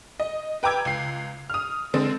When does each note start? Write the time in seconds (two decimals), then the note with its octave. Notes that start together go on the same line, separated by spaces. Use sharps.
0.20 D#5
0.63 B4 G5 A#5 D6 E6 G#6
0.85 C#2 C7
1.50 D#6 F6
1.94 D3 G#3 C4 A6